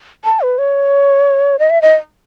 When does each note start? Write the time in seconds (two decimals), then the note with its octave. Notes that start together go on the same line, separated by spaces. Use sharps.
0.25 A5
0.41 B4
0.58 C#5
1.59 D#5
1.70 E5
1.82 D#5